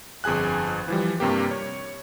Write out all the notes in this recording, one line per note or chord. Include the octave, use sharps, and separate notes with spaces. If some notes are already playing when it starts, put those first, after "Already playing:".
G1 F2 G#4 G#5 F#6
E3 F3 G3
G2 C3 A#3 G4
C#5